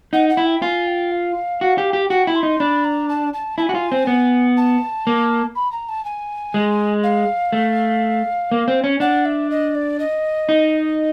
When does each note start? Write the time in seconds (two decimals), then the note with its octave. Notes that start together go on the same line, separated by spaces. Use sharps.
0.13 D#4 F#5
0.29 F#5
0.37 E4
0.46 G5
0.62 F4 G#5
0.87 G5
1.11 F5
1.61 F#4
1.78 G4
1.93 G4
2.10 F#4 G5
2.27 E4
2.35 C6
2.43 D#4
2.60 D4 B5
2.84 A#5
3.09 A5
3.33 A5
3.58 E4 A5
3.62 G#5
3.69 F#4
3.75 F4
3.92 C4
4.07 B3
4.57 A5
5.07 A#3
5.55 B5
5.72 A#5
5.88 A5
6.05 G#5
6.54 G#3
7.03 F5
7.52 A3
8.52 A#3
8.68 C4
8.84 C#4
9.00 D4 F#5
9.25 E5
9.50 D#5
9.75 D5
9.99 D#5
10.49 D#4